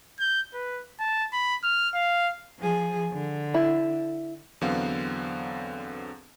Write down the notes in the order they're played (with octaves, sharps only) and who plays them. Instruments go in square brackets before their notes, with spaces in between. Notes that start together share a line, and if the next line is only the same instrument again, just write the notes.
[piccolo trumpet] G6
B4
A5
B5
F6
F5
[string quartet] F3 G#4
D3
[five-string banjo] E4
[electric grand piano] E2 D3 F#3 B3 C4 F5